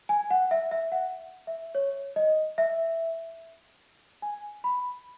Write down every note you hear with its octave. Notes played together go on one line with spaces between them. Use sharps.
G#5
F#5
E5
E5
F#5
E5
C#5
D#5
E5
G#5
B5